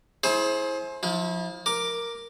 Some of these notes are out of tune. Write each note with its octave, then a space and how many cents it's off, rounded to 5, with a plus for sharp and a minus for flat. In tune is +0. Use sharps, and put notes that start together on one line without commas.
E4 -10 G#4 +30 C5 +25
F3 +20 E4 -30
A#4 +0 D6 +5